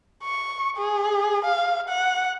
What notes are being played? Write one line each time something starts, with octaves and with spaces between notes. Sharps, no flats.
C#6
G#4
F5
F#5